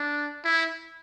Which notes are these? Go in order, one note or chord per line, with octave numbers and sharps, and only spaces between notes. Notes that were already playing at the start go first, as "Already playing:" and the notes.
Already playing: D4
E4